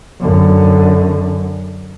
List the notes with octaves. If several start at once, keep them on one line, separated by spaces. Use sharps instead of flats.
F#2 D3